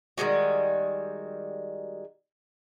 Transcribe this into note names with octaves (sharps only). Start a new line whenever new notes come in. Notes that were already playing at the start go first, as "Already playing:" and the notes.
D#3 G3 G#3 F#4